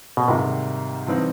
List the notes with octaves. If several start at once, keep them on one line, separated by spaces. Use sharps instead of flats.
B2
G#2 C3 D#3 G3 A#3
G2 E3 G3 C4 D#4